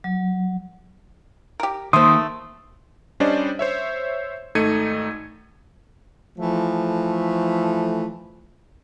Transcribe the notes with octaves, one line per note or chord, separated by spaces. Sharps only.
F#3
G4 A#4
D#3 A3 A#3 C5 C6 D#6
G3 C#4 D4 C5 D5 D#5
C5 C#5 E5
G#1 A3 D#4 G#6 C#7 D#7
E3 F3 A3